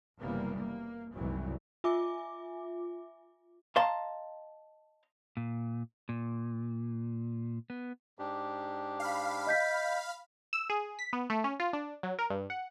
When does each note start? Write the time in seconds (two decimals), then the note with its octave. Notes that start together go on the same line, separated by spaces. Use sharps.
0.21 F#1 C3 E3 G3 A#3 B3
0.59 A#3
1.14 F#1 C2 G#2 E3 F#3
1.84 F4 E5 G#5 D6
3.76 D#5 F5 A5 A#5 C6
5.37 A#2
6.09 A#2
7.70 B3
8.19 G#2 D4 G4
9.00 F5 B5
9.47 D#5 G6 B6
10.53 E6
10.70 G#4
10.99 B6
11.13 B3
11.30 A3
11.44 C#4
11.60 F4
11.73 D4
12.03 F#3
12.19 A#4
12.30 G2
12.50 F#5